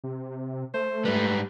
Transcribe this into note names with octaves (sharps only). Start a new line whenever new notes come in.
C3
A3 C5
G#2 G3 B4